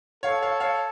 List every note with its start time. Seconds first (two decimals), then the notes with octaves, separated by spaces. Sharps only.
0.23 A4 C#5 F5
0.42 C#5 F5
0.60 C#5 F5